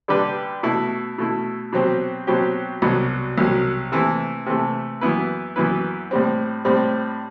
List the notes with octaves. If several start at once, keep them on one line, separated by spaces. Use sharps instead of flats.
D3 G3 D4 G4 B4
B2 A3 E4
B2 A3 E4
B2 F#3 C4 G4
B2 F#3 C4 G4
C2 B2 F#3
C2 B2 F#3
C3 E3 A3
C3 E3 A3
F#2 E3 B3 E4 B4
F#2 E3 B3 E4 B4
A2 G3 C4
A2 G3 C4